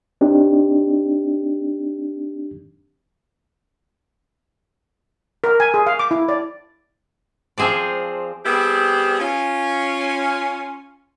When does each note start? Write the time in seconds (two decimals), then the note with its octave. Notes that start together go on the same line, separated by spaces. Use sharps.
0.21 C4 D4 D#4 G4
5.44 A#4
5.60 G#5
5.74 G#4
5.86 F5
5.99 D6
6.11 E4
6.29 D5
7.58 F3 C4 G#4 C5 D5
8.45 G3 B3 C4 E4 G4 G#4
9.20 C#4 F4